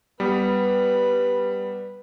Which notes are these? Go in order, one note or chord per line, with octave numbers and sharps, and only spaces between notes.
G3 B3 B4